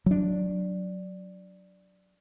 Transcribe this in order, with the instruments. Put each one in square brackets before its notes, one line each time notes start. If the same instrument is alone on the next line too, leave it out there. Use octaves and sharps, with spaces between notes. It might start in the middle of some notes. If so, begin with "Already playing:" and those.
[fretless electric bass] F#3 D4